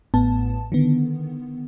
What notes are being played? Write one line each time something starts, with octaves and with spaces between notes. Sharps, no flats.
A1 A2 B3 A5
D3 D#3 B3